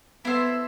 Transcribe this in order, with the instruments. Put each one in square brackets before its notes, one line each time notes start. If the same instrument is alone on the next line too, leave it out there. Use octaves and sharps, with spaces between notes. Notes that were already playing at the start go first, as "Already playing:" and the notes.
[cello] B3 [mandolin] E4 A4 C5 E5